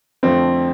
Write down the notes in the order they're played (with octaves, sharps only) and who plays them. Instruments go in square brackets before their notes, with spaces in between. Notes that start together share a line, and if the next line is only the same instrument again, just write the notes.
[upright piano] F2 D3 F3 A3 F4 [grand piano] C4